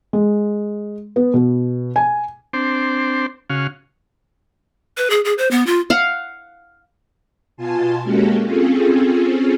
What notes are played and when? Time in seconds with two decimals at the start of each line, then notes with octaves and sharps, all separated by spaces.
0.13 G#3
1.16 B3
1.34 B2
1.96 G#5
2.53 C4 D4 C5
3.50 C#3 C#4 F#4 F5
4.97 B4
5.10 G#4
5.25 G#4
5.38 C5
5.51 B3
5.66 F4
5.90 F5 F#5
7.57 B2 F4 G#5 A5 C6
8.04 G#3 A#3 C#4 F#4 G4 A4
8.44 C4 C#4 F4 G#4 A4